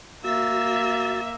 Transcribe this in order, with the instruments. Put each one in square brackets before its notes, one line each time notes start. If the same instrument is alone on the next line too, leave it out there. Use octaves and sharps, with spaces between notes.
[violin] A#3 [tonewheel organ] F#4 A6 [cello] E5